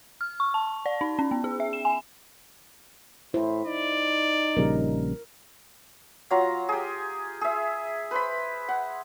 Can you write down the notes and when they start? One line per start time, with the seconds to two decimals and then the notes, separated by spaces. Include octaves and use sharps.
0.21 F6
0.40 C#6
0.54 A5
0.86 D5
1.01 D#4
1.19 C#4
1.31 B3
1.44 G#4
1.60 E5
1.73 E7
1.85 G#5
3.34 A2 E4 C5
3.66 D#4 D5
4.57 A#1 C#3 G3 A#4
6.31 F#3 F4 A#5
6.69 G4 G#4
7.41 G#4 E5
8.11 B4 C5 B5
8.69 F#5